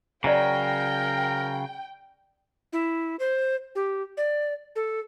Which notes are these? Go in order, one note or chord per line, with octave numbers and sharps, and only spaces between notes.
C#3 F#3 A#4 D5 G5 A#5
E4
C5
G4
D5
A4